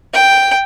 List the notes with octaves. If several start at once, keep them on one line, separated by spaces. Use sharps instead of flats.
G5